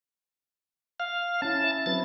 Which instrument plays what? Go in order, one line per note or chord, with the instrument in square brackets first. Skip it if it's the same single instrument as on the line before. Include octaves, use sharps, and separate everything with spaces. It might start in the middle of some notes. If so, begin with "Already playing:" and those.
[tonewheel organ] F5
[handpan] C#4 E4 [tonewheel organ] A5
[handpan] E5
[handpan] F#3 C4 B4 [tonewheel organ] A6